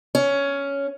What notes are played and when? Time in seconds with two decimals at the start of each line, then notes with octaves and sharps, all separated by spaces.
0.15 C#4